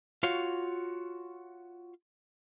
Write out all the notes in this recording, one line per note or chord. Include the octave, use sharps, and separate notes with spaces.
F4 F#4 C#5 F5